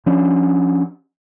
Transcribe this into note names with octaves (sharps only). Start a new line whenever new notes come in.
F3 C#4 D4